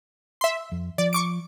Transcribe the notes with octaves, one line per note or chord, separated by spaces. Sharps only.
E5 C6
F2
F3 D5
C#6 D6 D7